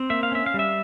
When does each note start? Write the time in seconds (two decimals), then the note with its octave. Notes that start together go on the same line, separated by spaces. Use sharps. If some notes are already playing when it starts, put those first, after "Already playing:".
Already playing: C4
0.10 A#3 E5
0.23 F5
0.32 C#4 E5
0.46 F5
0.54 G3
0.59 E5